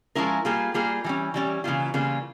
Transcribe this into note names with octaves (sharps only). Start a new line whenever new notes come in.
F3 G#3 C#4 E4 A#4
G3 A#3 F4 G#4
G3 A#3 F4 G#4
E3 G3 C#4
E3 G3 C#4
C#3 E3 G3 A#3 F4
C#3 E3 G3 A#3 F4